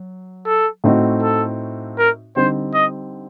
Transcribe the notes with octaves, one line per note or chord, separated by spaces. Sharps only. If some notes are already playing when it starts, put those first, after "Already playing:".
Already playing: F#3
A4
A2 A3 C4 D#4 F#4
A4
A#4
D3 G3 C4 D#4 C5
D#5